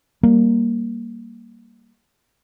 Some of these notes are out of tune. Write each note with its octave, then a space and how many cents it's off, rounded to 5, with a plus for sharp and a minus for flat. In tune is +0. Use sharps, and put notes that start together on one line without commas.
G3 +0 A#3 +0